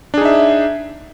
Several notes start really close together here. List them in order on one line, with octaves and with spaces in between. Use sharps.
D4 G#4 D#4 E5